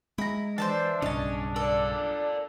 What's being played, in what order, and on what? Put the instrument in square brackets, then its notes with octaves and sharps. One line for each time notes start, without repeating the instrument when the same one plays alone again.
[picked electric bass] G#3 [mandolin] E4 A#5
[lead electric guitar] E3 [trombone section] D4 [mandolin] C5 E5 A5
[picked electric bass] B1 G2 C#3 [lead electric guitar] C#4 [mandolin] D#5 A5
[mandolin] A4 [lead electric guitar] A#4 D5